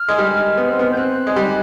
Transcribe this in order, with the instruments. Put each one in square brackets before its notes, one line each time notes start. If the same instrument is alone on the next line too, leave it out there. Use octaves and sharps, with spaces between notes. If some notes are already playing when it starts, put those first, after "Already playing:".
Already playing: [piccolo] F6
[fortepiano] G#3
G3
B3
C4
B3
[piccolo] G6
[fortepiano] C4 [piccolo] F#6
[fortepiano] G#3
G3